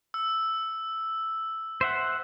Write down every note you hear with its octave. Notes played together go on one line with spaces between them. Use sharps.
E6
C5 E5 F#5